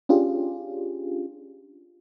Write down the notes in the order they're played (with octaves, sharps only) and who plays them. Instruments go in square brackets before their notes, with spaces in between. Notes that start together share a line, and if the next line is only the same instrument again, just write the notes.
[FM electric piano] C#4 D4 F4 G4 G#4